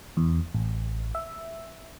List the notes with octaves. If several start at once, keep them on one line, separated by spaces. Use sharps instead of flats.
E2
A1
E5